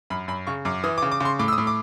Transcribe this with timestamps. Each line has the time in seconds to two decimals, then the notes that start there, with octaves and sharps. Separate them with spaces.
0.10 F#2 B5
0.28 F#2 B5
0.47 C#3 C#6
0.65 F#2 D6
0.84 E3 D#6
0.98 D6
1.02 C#3
1.12 D6
1.20 C#3 C6
1.39 A2 D6
1.48 E6
1.53 D#6
1.58 A2
1.67 D6